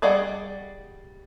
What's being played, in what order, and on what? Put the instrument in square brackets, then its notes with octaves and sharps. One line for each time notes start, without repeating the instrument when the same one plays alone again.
[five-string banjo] G3 G#4 D5 D#5 F#5